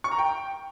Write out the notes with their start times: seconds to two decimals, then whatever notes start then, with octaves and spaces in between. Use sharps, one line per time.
0.04 C#6
0.11 A#5
0.18 G5